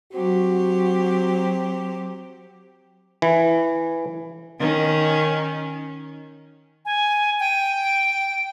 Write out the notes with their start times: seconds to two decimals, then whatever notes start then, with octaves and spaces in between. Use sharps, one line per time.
0.13 F#3 C4 F#4 G4
3.22 E3
4.60 D#3 C#4
6.85 G#5
7.40 G5 D#7
7.84 D7